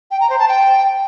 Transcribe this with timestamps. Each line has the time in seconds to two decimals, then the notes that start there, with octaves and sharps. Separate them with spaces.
0.11 G5
0.20 A#5
0.30 C5
0.39 A5
0.48 G5